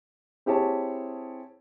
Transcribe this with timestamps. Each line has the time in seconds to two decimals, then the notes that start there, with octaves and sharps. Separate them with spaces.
0.46 C4 E4 G4 G#4 C#5 A5